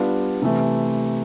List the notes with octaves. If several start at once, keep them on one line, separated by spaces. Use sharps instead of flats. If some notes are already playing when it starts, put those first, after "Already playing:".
Already playing: G3 B3 D4 F4
C3 E3 A3